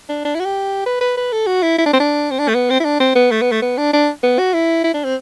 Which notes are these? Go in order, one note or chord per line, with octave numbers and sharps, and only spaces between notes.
D4
D4
E4
F#4
G4
B4
B4
B4
A4
F#4
E4
E4
D4
C4
D4
C4
D4
A3
B3
C4
E4
D4
C4
B3
A3
B3
A3
B3
D4
D4
B3
F#4
E4
E4
D4
C4